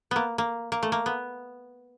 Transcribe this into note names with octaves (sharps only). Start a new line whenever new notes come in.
A#3 B3
A#3
A#3
A3
A#3
B3